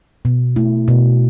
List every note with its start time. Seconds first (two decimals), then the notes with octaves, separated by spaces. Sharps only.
0.25 B2
0.56 A3 E4
0.88 B2